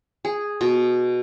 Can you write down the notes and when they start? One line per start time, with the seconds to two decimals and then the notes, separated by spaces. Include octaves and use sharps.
0.25 G#4
0.61 B2